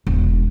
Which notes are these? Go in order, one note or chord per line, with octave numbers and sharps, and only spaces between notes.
E1